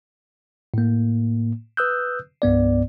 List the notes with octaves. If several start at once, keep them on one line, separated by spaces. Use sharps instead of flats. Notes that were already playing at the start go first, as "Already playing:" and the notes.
A2 A#3
B4 D#6 E6 F#6 G6
C2 G2 B3 D5